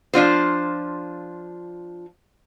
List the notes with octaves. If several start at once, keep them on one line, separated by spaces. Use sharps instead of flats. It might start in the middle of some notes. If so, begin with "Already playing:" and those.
F3 D4 F4 C5